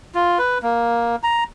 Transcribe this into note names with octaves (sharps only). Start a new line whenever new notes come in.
F4
B4
A#3
A#5